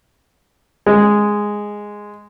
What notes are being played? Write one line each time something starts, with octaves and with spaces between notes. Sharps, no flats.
G#3